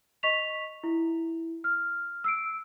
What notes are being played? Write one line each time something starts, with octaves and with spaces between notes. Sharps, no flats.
D#5 C#6 B6 F7
E4
F6
E6 C7 D7